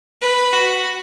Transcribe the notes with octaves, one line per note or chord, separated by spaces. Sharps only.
B4
F#4